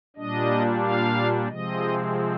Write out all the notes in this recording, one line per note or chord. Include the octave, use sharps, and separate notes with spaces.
A#2 G3 D4 D#5
F5
C3 F3 G#3 C4 D#5